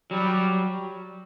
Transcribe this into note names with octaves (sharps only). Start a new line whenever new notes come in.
F#3 G3